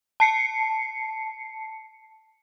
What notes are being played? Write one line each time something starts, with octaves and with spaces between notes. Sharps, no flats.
A5 C7 C#7